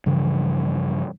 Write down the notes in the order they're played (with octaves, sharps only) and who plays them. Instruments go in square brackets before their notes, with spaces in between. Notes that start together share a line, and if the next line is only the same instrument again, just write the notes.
[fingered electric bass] G2 C#3 E3 F3